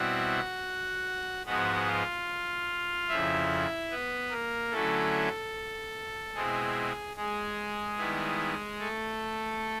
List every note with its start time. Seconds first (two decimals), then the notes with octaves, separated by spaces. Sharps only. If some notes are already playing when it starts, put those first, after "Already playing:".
Already playing: B2 G3 C4 E4 F#4 F#5
1.45 G#2 F3 G#3 B3 F#4 F#5
1.87 F4 F5
3.08 F2 C#3 F3 E4 E5
3.90 B3 B4
4.31 A#3 A#4
4.71 D3 F#3 A3 C#4 E4 A4
6.35 B2 G#3 C4 E4 G#4
7.17 G#3 G#4
7.97 D#3 G3 B3 E4
8.79 A3 A4